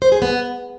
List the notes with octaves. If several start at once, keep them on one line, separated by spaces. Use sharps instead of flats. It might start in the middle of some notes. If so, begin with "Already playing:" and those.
C5
G#4
B3